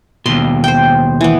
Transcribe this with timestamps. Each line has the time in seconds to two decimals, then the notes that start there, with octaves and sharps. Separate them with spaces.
0.26 D#2 B2 C6
0.64 C5 G5
1.21 E3 B3